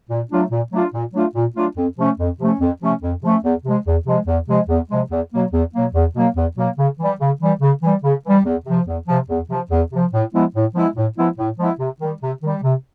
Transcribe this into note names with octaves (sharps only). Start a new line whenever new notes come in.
A#2
F#3 A3 D4 F4
A#2
F#3 A3 D4 F4
A#2
F#3 A3 D4 F4
A#2
F#3 A3 D4 F4
F2
C3 F3 A3 C#4
F2
C3 F3 A3 C#4
F2
C3 F3 A3 C#4
F2
C3 F3 A3 C#4
E2
C3 F3 G#3
E2
C3 F3 G#3
E2
C3 F3 G#3
E2
C3 F3 G#3
E2
B2 F#3 A#3
E2
B2 F#3 A#3
E2
B2 F#3 A#3
E2
B2 F#3 A#3
C#3
E3 G3
C#3
E3 G3
C#3
E3 G3
C#3
E3 G3
E2
C3 F3
E2
C3 F3
E2
C3 F3
E2
C3 F3
A2
F3 G#3 B3 E4
A2
F3 G#3 B3 E4
A2
F3 G#3 B3 E4
A2
F3 G#3 B3 E4
C3
D#3 G3
C3
D#3 G3
C3